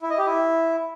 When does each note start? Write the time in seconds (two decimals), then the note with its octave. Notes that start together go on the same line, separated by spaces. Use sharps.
0.02 E4
0.10 D#5
0.18 G4
0.26 E4